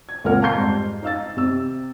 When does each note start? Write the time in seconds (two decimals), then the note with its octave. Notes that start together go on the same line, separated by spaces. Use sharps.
0.09 G#6
0.24 C#2 A#2 C4 A#4 F#5 F6
0.42 F5 A5 A#5 C6 G6 C7
0.54 F2 G#2 G3
1.03 D#4 F5 E6 A6
1.37 C3 E6